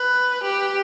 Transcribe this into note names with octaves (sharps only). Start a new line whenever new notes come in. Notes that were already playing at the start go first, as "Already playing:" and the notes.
Already playing: B4
G4